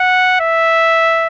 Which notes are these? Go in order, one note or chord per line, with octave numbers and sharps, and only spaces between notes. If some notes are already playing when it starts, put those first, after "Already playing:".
Already playing: F#5
E5